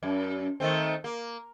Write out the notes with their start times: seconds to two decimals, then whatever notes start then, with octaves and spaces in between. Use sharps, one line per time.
0.03 F#2
0.60 D#3 A3 C4
1.04 A#3